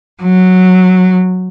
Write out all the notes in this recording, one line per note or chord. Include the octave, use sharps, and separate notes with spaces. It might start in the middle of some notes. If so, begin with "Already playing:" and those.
F#3